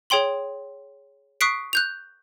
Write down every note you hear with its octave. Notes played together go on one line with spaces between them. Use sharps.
G#4 C#5 G5 C6 F#7
C#6 D#6 F#6 B6 C7 D7
F#6 G6 F7